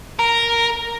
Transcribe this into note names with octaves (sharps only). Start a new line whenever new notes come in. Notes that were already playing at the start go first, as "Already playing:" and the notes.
A#4